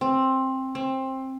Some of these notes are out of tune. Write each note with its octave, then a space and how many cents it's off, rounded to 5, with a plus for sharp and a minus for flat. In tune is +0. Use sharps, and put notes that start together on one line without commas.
C4 +15
C4 +20